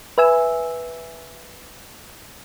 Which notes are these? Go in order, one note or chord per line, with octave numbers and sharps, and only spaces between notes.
B4 E5 G#5 E6